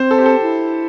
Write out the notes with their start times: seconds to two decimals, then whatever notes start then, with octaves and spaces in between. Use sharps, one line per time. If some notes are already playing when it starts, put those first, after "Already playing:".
Already playing: C4 C5
0.11 A4
0.18 G4
0.26 A4
0.42 E4